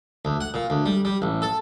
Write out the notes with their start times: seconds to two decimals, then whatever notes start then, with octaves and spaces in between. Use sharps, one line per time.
0.25 D2
0.41 F#5
0.54 A#2
0.70 D2
0.86 G3
1.05 G3
1.22 A1
1.42 A4